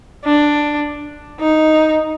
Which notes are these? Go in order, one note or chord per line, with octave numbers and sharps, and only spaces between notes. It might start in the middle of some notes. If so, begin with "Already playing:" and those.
D4
D#4